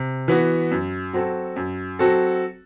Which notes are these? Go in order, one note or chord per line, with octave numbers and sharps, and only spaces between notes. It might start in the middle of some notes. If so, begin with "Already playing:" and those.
Already playing: C3
E3 B3 F#4
F#2
F#3 C4 F#4 A4
F#2
F#3 C4 F#4 A4